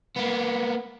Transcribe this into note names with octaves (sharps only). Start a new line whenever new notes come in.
A#3 B3